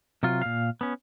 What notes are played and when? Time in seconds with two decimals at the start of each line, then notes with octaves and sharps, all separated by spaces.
0.23 C3 F#3 F4
0.42 A#2 F5
0.81 B3 C#4